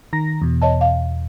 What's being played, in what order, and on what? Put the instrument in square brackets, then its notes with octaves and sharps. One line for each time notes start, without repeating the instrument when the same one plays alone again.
[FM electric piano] D#3 A#5 A#6
E2 B2
[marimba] C#5 D#5 A5
F5